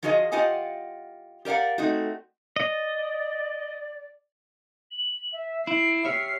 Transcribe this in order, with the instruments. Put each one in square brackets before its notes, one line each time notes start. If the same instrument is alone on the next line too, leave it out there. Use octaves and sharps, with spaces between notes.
[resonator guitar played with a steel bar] F3 F4 F#4 G#4 C#5 D#5
F4 G4 D#5 F#5 G#5
G4 A#4 D5 F5 F#5
A3 C4 D#4 F#4
[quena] D5 [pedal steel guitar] D#5
[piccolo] F#7
E5
[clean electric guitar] E4 [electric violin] C7 [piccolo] D7
[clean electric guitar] G4 C#5 E5 [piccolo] F6